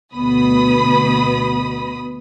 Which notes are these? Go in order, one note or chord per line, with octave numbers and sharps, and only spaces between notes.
D2 B2 B3 B5 D#6